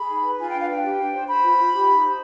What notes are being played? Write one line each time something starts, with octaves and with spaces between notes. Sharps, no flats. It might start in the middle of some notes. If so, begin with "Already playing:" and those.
Already playing: G#4 B5
D#4
B4
F4 G#5
D4 G5
F5
B4 G5
G4
D4
C5
C5 B5
F4
F4
G4
D#4
C5